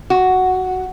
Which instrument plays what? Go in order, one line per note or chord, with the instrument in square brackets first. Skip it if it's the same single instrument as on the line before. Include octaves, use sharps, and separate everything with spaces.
[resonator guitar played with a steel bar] F#4